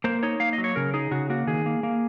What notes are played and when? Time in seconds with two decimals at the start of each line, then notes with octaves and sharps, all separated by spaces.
0.04 A#3 C5
0.23 D#4 C#5
0.40 A#3 F5
0.53 D#5
0.58 F#3
0.64 C#5
0.76 C#3 A#4
0.94 D#4 G#4
1.11 C#3 F#4
1.30 A#3 F#4
1.47 D#3 G#4
1.66 A#3
1.83 A#3